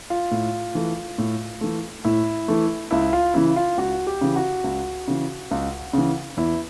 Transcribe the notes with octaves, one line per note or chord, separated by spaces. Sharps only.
F4
A2
E3 A3
A2
E3 A3
A2 E4
E3 A3
C#2 E4
F4
C#3 E3 E4
F4
C#2 F#4
G4
C#3 E3
F#4
C#2
C#3 E3
C#2
C#3 E3
E2 E4